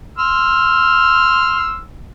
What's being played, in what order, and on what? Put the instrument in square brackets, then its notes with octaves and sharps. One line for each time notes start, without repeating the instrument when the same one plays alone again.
[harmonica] C6 E6 F6